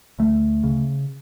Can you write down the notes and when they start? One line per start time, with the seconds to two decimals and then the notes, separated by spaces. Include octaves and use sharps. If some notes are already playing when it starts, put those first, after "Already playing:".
0.19 D2 A3
0.63 C#3